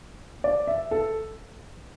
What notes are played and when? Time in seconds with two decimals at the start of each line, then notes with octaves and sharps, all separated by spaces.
0.44 D5
0.67 E5
0.91 A4